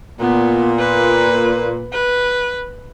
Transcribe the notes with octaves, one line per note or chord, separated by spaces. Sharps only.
A#2 B3
B4
B4